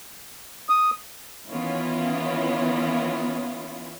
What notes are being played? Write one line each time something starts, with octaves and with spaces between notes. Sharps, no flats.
D#6
D#3 E3 B3 C#4 E4 F4